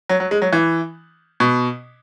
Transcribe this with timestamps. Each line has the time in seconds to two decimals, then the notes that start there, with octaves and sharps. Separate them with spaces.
0.09 F#3
0.20 F#3
0.31 G#3
0.42 F#3
0.53 E3
1.40 B2